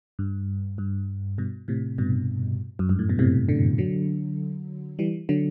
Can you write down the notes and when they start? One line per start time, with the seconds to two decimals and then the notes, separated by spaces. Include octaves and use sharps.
0.19 G2
0.78 G2
1.38 G2 B2
1.68 A2 C3
1.98 G2 B2
2.79 F#2
2.89 G2
2.99 A2
3.09 B2
3.19 A2 C3
3.49 B2 D3
3.78 D3 F#3
4.99 E3 G3
5.29 D3 F#3